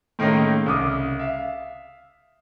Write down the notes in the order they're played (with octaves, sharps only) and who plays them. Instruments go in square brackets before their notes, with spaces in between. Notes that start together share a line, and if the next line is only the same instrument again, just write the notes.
[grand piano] A2 D#3 G#3 A#3 C#4 D#4
C2 C#3 D6 D#6
E5 F5